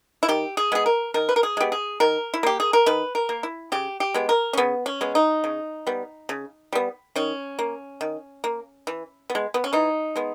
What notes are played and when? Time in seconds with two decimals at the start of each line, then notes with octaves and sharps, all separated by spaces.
0.23 E4
0.29 D#3 G4
0.57 G#4
0.72 G#3 B3 G#4
0.86 A#4
1.14 D#3 A#4
1.29 B4
1.36 A#4
1.43 G#4
1.57 G#3 B3 G4
1.72 G#4
2.00 D#3 A#4
2.34 E4
2.43 A#3 G4
2.60 G#4
2.73 A#4
2.86 D#3 B4
3.15 A#4
3.29 A#3
3.43 E4
3.72 C#3 G4
4.00 G4
4.14 G#3 B3
4.29 A#4
4.53 C#4
4.58 C#3 B3
4.86 C#4
5.01 G#3 B3
5.15 D#4
5.44 C#3
5.87 G3 B3
6.29 C#3
6.73 G3 B3
7.16 D#3 C#4
7.59 A#3
8.01 D#3
8.44 A#3
8.87 E3
9.30 B3
9.35 G#3
9.54 B3
9.64 C#4
9.73 E3 D#4
10.16 G#3 B3